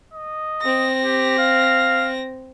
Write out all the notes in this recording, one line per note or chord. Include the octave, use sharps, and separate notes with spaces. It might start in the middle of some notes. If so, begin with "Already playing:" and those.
D#5
C4 A#6
G4
F5